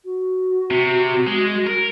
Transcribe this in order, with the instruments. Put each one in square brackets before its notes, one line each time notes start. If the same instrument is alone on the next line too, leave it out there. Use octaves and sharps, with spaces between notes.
[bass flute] F#4
[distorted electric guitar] C3
G#3
A#4